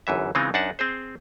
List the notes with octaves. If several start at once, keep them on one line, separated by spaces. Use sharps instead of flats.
G1 F#2 E3 E5
C#3 E3 G#3 C4 D#4 F4
F#2 D4 D#4 F#5 A5
C4 G#4 C5